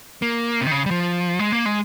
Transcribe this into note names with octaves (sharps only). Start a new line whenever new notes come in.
A#3
C3
D#3
C#3
G3
F3
G#3
A#3
G#3